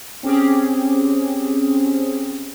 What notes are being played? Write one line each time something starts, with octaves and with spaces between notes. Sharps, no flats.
C4 C#4 G4 G#4